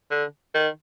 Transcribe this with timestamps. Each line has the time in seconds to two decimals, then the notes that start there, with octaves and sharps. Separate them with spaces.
0.11 D3
0.54 D#3